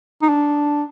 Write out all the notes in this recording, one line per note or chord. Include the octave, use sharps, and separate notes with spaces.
D#4
D4